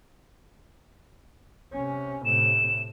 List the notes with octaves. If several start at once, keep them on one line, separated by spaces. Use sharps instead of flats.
C3 C#4
A2 C3 E7